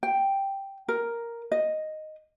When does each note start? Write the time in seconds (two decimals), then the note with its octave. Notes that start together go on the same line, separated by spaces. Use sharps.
0.03 G5
0.88 A#4
1.52 D#5